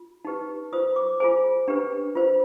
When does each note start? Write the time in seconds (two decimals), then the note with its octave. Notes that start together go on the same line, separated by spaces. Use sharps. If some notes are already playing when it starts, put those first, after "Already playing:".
Already playing: F4
0.25 D#4 G4 B4
0.72 F4 C5 D#6
0.96 D6
1.20 F4 G#4 C5 G#5
1.68 D4 G4 B4
2.15 F4 C5